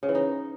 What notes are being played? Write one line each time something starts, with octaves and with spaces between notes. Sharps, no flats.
C#3
E3
D#4